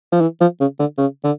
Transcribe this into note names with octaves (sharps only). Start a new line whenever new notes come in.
F3
E3
F3
C#3
D3
C#3
D3